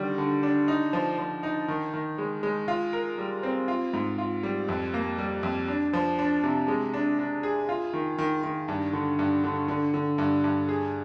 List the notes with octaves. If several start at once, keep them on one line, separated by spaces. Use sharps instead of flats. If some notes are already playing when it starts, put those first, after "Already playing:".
Already playing: D3 D#3 G3
D3
D4
D#4
F3
F3
D#4
D#3
D#3
G#3
G#3
F4
A#4
G3
C4
F4
G#2
F4
G3
F2
A#3
G3
F2
D4
F3
D4
C3
G#3
D4
D4
G#4
F4
D#3
D#3
D#3
G2
D3
G2
D3
D3
D3
G2
G2
G#4